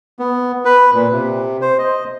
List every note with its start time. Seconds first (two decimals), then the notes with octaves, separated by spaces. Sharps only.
0.19 B3
0.65 B4
0.94 A#2
1.12 C3
1.62 C5
1.79 D#5